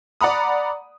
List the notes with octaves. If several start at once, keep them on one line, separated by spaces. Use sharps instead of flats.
D5 F#5 A#5 B5 D#6